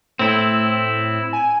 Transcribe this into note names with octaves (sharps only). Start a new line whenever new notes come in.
A2 C4 E4
G#5